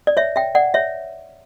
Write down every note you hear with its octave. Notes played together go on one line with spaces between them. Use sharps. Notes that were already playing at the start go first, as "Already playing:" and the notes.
D5
C#5 E5
E5 G5
D5 F#5
C#5 E5